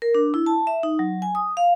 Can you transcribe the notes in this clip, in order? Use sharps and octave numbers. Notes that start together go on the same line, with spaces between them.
A#4
D4
E4
A5
E5
D#4
F#3
G#5
D#6
F5